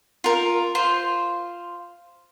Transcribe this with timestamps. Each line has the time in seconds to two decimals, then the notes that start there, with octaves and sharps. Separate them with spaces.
0.24 F4 A#4
0.75 F4 C5